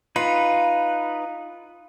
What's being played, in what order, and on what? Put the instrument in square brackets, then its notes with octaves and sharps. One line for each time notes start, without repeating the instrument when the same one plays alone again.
[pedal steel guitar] D#4 B4 [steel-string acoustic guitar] F4